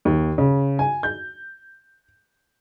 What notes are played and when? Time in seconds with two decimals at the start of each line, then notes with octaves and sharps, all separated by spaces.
0.05 D#2
0.38 C#3
0.79 G#5
1.03 G6